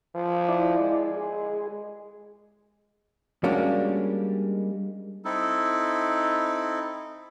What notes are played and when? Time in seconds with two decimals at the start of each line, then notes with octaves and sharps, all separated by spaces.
0.15 F3
0.49 E4 D5
0.80 G#3
1.17 G#4
3.44 G3 G#3 A#3 C#4 D4 F#4
5.25 C4 D#4 E4 A4